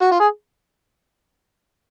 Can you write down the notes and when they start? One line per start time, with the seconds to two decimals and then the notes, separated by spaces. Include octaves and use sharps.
0.01 F#4
0.11 F4
0.20 G#4